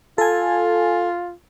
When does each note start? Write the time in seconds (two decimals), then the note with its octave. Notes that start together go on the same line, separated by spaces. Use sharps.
0.18 F4 A4 G#5